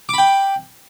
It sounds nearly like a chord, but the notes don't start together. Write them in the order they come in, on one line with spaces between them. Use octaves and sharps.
D6 B5 G5